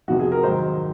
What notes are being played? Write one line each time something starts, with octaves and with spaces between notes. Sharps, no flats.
F1 F2 C3 F3 F#4
G#4
A#4
G#1 G#2 D#3 F#3 C5